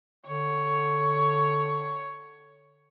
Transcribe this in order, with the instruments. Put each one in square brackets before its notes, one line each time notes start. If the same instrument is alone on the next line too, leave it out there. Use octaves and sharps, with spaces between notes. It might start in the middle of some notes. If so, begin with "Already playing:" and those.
[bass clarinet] D3 [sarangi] C#5